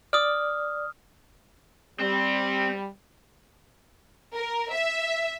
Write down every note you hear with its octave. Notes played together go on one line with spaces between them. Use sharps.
D5 D#6 F6
G3 C4
A#4
E5